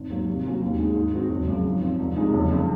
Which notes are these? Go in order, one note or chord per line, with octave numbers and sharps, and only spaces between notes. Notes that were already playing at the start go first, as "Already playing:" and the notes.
Already playing: G#1
G#2 F#3 A#3
C3
F#3 A#3 C#4 F#4
D#2
D#3 G#3
G#2
D#3 G#3 C4 F#4
F#1
F#2 C#3 F3
G#2
F3 C4
C2
C3 F3 G#3 D#4
F#1
F2 C#3